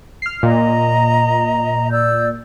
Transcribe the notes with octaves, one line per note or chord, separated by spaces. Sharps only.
F6 C7
A#2 D#5 A#5
D5 E6 G6